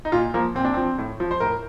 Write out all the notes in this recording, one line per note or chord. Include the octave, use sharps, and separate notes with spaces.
D#4
A#2 F4
F3 A#3
A#2 C4
D4
F3 C4
A2
F3
C5
A2 A#4